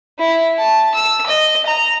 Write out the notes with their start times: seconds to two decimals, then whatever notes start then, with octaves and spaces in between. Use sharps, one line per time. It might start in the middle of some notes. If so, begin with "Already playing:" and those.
0.19 E4
0.58 A5
0.95 E6
1.26 D#5
1.66 A#5